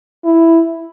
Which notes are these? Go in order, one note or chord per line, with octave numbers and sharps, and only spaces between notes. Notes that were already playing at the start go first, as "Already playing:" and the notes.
E4